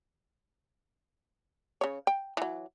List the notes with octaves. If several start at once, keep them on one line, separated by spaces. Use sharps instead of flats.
C#3 C#5
G5
E3 F#3